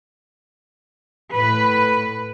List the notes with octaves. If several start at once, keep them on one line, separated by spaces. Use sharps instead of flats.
A2 B4